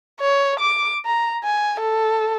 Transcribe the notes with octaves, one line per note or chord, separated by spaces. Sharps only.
C#5
D6
A#5
G#5
A4